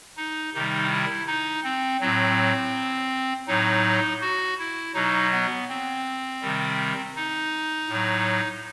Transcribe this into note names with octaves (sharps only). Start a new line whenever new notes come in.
D#4
C3 D#3 G3 D#4
E4
D#4
C4
A2 F#3 C4
A2 F#3 D#4
F#4
E4
B2 F#3 D#4
B3
C4
C3 D#3 G3
D#4
A2
F#3